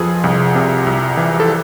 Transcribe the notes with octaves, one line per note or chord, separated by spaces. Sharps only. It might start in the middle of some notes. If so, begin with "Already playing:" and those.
Already playing: F2 F3 F4 G#4 A4 B4
C2
C3
C2
E3
A4